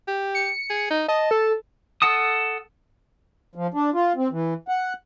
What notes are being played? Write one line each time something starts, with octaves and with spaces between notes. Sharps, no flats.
G4
C#7
G#4
D#4
D#5 A5
A4
A4 F#5 A5 D#6
F3
D4
F4
C4
E3
F#5